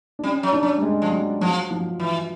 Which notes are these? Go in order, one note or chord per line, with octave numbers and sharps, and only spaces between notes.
D4
G3 C#4
F#3
D4
F#3
G3
G#3
F3
F#3
F3 F#3
F3
E3